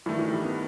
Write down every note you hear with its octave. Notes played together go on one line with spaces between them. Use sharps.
G2 D#3 E3 A3
E3
G3
B3